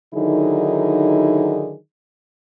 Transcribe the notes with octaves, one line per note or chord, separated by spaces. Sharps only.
D3 D#3 F#3 D#4 E4 G#4